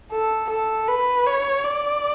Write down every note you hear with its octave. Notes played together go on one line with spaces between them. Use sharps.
A4
A4
B4
C#5
D5